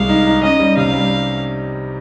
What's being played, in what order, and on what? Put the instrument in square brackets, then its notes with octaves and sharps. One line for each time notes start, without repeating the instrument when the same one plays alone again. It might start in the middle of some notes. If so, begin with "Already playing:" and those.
Already playing: [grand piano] C2 G#3 [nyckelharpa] F5
[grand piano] D#4
D#4
[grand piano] C#4 [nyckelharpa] D#5
[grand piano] G3
[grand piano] C3 [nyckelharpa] F5
[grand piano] G3